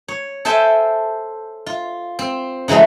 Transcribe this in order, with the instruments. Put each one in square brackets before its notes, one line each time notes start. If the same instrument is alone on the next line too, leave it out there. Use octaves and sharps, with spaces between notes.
[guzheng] C#5
A4 C5 E5 G5 G#5
F4
C4
C#3 E3 F#3 G#3 A3